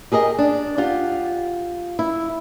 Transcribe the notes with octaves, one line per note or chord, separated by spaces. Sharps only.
G4 G#4 A#4 D#5
D4
F4 G4 F#5
E4